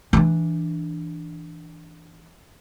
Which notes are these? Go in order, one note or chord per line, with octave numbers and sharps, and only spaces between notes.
E3 D4